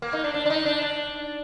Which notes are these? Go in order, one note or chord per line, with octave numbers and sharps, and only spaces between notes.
A#3
D#4
D4
D4
D4
D#4
D4
D4